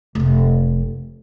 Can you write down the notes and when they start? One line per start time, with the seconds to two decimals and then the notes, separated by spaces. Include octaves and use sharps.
0.15 F1 C3